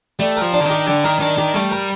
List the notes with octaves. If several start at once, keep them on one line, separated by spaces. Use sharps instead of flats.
G3 A3
F3 A#4
D4
D3
D#3 G4
D3 G3
D#3 A#4
D#3 D4
D#3 G4
G3 A3
A#4